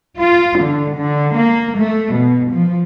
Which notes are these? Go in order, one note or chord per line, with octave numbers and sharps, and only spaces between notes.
F4
D3
D3
A#3
A3
B2
F3